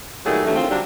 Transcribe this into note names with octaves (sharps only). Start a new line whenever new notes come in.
A#2 D#3 F#3 G3 A3 G#4
B2 D3 E3 F#3 G3 A3
D2 D#3 C4 F4
D3 F#3 G3 D4